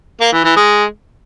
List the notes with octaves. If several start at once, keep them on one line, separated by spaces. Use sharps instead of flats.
A#3
E3
E3
G#3